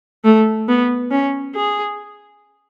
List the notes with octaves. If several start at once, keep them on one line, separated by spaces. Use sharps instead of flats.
A3
B3
C#4
G#4